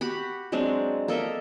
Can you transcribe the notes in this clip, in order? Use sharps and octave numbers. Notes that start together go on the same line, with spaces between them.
F#4 G4 F#5 B5
F#3 G#3 C4 D4
A#3 A4 D#5 E5